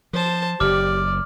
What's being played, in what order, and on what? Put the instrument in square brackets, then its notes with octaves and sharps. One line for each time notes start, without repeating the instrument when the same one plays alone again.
[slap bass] F3 [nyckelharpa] C5 A5
[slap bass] F#1 [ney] G4 [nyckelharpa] D5 [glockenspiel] D6 F6